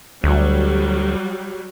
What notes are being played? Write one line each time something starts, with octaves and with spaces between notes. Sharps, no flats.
D2 F#3 G3